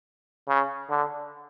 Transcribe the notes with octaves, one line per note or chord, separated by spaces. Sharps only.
C#3
D3